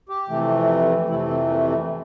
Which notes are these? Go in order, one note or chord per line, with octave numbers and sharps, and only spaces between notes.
G4
F2 C3 E3 A3
F2 C3 E3 A3 E4
C4
A#3
A3